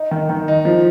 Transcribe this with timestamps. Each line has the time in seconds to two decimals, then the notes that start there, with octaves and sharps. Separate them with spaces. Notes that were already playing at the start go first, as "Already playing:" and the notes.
Already playing: D#4
0.11 D#3
0.30 D#3
0.48 D#4
0.65 F3